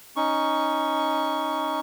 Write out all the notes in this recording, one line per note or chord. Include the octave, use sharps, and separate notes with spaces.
C#4 D#4 C#6